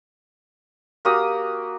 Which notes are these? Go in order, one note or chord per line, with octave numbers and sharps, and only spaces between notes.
A#3 F#4 G4 D#6